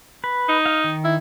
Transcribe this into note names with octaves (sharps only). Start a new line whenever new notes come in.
B4
D#4
F5
D#3
E4